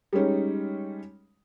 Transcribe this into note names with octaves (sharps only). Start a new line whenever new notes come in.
G3 G#3 C#4 D#4